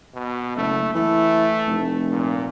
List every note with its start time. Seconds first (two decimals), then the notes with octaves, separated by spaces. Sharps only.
0.15 B2
0.56 F#1 A3
0.95 E3 A3
1.67 F1
2.11 A#2